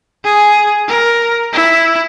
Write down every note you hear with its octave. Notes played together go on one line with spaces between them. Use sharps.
G#4
A#4
E4